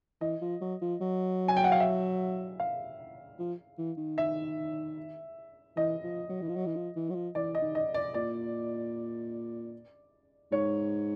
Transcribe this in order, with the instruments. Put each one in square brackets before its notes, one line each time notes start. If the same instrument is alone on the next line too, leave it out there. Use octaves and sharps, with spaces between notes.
[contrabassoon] E3 [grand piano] D#5
[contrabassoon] F3
F#3
F3
F#3
[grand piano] G#5
G5
F#5
F5
E5
F5
[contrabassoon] F3
E3
D#3
[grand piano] E5
[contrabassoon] E3 [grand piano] D#5
[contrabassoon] F3
F#3
E3
F3
F#3
E3
F3
E3
F#3
F3
[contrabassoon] E3 [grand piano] D5
[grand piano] D#5
[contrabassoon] D#3
[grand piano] D#5
D5
[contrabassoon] A#2 [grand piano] D5
[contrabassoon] G#2 [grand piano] C#5